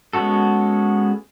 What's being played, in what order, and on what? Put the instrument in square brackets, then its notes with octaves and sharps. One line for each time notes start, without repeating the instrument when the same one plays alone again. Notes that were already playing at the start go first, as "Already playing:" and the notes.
[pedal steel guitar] G#3 B3 C#4 F#4 A4